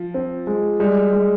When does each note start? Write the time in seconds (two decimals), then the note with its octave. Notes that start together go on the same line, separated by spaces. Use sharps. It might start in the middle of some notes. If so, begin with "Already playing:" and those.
Already playing: F3
0.14 C4
0.47 G#3
0.80 G3 G#3
1.13 G#3